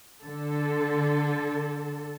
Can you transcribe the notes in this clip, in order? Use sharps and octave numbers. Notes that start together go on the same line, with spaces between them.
D3 A4